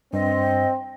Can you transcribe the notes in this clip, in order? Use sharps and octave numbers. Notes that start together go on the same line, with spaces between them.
G2 C4 D#5